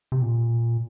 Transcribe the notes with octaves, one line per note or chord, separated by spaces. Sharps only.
C3
A#2